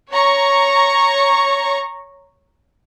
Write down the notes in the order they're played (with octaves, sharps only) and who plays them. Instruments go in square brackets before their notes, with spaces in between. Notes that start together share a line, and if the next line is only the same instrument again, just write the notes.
[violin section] C#5 A#5 C#6